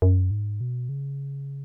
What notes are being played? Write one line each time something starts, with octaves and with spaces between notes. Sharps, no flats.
F#2
G#2
B2
C#3